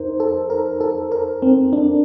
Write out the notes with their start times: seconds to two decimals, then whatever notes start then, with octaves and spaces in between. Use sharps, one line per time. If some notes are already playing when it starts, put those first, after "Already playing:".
Already playing: F2 D#4 A#4 C5
0.20 A4
0.50 A#4
0.81 A4
1.12 A#4
1.42 C4
1.73 D4